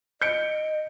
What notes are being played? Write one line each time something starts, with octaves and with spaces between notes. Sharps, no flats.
D#5 G6 C#7 D7